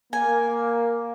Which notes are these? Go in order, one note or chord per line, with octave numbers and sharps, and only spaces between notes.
A#3 G#5